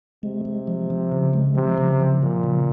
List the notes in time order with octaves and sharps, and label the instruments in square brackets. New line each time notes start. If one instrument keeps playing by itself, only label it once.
[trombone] C3 [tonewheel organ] G#3
[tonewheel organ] G#3
F3
F3
C#3
G#3
[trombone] C3 [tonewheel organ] F3
[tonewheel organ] C#3
F3
[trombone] A#2 [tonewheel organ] F3
[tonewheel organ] C#3